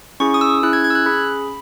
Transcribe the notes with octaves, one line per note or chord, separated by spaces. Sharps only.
C#4 E4 G#4 C#6
D#6
E6
C#4 E4 G#4 F#6
G#6
G#6
E6
F#6
C#4 G#4 B5